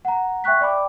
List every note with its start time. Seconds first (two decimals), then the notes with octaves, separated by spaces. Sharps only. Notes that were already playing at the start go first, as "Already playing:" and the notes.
0.05 F#5 A#5
0.44 E5 G5 C#6 F#6 B6
0.61 D5 G5 B5 D6